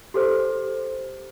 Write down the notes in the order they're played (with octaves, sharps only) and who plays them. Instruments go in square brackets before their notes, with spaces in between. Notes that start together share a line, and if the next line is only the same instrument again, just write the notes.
[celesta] G4 A4 C5